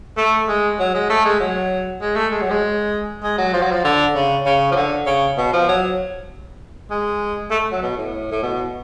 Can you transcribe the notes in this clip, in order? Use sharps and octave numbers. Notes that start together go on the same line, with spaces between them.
A3
G#3
F#3
G#3
A3
G#3
F#3
G#3
A3
G#3
F#3
G#3
G#3
F#3
F3
F#3
F3
D3
C#3
C#3
F3
D3
C#3
B2
F3
F#3
G#3
A3
F#3
B2
A2
A2
B2